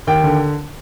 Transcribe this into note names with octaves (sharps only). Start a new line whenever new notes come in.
D#2 G5
D3